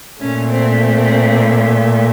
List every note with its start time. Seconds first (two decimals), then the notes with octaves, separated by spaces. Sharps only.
0.20 A#2 A3 C#4
0.50 C4
0.80 C4